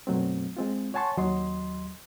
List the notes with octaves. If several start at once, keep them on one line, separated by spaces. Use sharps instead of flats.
F#2 B2 F#3 A3 C4
G#3 C4 F4
C#5 F#5 G#5 A5 C6 C#6
D#2 F#3 D#5 C6